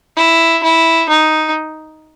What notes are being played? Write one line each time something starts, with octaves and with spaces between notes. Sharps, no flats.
E4
E4
D#4